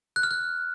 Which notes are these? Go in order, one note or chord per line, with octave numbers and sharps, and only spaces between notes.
F#6
F6
F#6